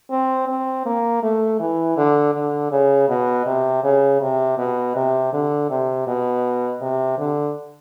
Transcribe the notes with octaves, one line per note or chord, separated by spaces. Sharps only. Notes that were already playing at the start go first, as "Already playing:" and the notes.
C4
C4
A#3
A3
E3
D3
D3
C#3
B2
C3
C#3
C3
B2
C3
D3
C3
B2
C3
D3